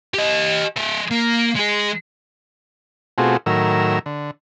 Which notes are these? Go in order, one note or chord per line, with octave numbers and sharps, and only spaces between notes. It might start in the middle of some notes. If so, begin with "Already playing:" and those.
G4 D#5
G#3 E5
A#3
G#3 G#4
B2 A3 C4 F4 F#4 G#4
A2 D#3 F#3 A#4 E6
D3